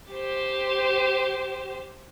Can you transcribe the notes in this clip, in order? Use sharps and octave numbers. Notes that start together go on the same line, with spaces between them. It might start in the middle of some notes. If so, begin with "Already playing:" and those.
G4 C5